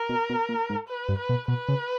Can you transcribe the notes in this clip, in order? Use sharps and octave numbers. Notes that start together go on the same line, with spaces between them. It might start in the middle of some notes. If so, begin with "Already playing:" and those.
Already playing: A#4
B2
B2
A#2
G#2
B4
G2
B4
B2
B2 B4
C#3